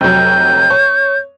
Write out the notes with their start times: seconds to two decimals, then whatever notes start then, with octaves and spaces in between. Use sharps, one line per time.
0.01 F1 F#3 G6
0.70 C#5